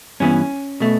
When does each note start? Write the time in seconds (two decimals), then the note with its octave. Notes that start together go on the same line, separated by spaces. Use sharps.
0.20 G2 E3 G3 B3 C#4
0.80 B2 A3